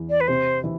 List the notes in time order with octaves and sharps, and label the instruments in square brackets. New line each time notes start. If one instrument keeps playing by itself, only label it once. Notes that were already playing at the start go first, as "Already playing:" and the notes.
Already playing: [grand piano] E2 E3
[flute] D5
B4
[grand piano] C3 C4 [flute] C5
[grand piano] E3 E4